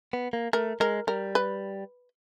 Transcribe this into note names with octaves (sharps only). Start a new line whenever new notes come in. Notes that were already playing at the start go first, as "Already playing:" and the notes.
B3
A#3
A3 A#4
G#3 A#4
G3 A#4
B4